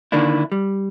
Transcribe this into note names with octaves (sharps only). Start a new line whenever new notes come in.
D3 D#3 A#3 D4 E4
G3